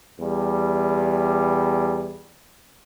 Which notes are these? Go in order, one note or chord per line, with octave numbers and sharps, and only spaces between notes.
E2 G3